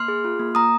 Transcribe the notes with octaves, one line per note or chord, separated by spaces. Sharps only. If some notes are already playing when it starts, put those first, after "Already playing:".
Already playing: A#3 C6 F6
G#4
F4
A#3
A#3 A#5 D#6